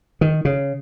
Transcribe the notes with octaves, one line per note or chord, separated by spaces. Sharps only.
D#3
C#3